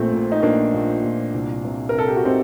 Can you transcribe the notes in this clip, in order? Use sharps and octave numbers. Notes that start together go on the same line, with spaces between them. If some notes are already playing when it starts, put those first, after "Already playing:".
Already playing: A#1 A#2 A3 C4
A#2
D#4
A#1 A#3 D4
A#1
A#1
C2
C3
A#4
C3 A4
G4
F#4
C3 C4 D#4